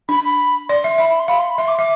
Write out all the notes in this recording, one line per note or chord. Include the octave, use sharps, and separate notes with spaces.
D4 B5
B5
D5 C6
E5
E5 B5
B5
C6
F5 B5
C6
B5
E5 C6
D6
E5 D6